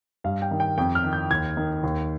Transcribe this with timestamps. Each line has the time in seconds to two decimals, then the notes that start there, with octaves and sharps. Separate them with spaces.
0.24 G2 F5
0.42 G5
0.51 D#3
0.60 G5
0.78 F2 G5
0.95 F6
1.04 D#3
1.13 G6
1.30 D#2 G#6
1.57 D#3
1.83 D#2